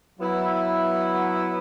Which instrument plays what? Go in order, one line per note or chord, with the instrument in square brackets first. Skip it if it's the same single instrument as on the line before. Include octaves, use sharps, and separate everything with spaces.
[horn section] F#3 B3 E4